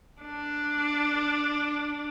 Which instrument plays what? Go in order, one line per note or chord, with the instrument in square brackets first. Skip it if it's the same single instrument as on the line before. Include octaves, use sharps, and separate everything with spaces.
[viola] D4